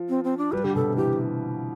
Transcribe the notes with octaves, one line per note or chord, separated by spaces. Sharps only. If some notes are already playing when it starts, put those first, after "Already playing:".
Already playing: F3
C4
C4
D4
G3 B4
D3 G4
B2 A4
C3
E3 G4